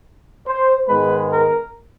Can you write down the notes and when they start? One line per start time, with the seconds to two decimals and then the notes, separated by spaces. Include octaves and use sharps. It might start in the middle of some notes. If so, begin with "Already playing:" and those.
0.47 C5
0.88 G#2 D#3 G#3 B3 B4
1.29 A#4